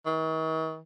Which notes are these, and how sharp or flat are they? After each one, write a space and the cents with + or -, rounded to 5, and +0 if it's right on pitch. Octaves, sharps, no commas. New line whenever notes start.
D#3 +45